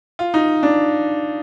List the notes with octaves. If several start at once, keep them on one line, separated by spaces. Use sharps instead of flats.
F4
D#4
D4